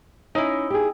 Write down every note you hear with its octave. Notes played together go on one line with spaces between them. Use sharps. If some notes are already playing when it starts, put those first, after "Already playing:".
C#4 D#4 E4
G4 G#4